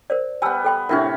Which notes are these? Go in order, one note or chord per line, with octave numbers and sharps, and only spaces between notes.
A#4 C5 D5
G3 B3 G#5 A5 E6
A4 G5 C6
A2 C3 C#4 D4 E4 A#4